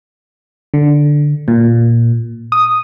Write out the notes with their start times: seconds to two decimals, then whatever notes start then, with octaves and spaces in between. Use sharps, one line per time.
0.74 D3
1.48 A#2
2.52 D#6